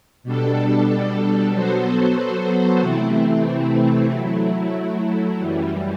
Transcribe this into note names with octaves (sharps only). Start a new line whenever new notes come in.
B2 G3 D4 A4
F#3 B3 F#4 A4 C5
C3 E3 A3 C4 E4
F#3 A3 E4
F#2 E3 G3